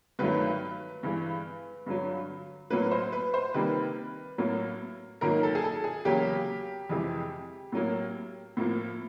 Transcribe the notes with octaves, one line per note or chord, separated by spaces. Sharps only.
G2 D#3 F#3 A3 B4
G2 E3 G#3
G2 D3 F#3
A2 F#3 A#3 B4
C5
B4
C5
C3 D#3 G3 A#3 B4
A2 F#3 A#3
G#2 D#3 F#3 A#3 A#4
A4
G#4
A4
G#4
E2 C#3 F#3 A#3 G4
F2 C3 E3 G#3
A2 F#3 A#3
A2 F3 A#3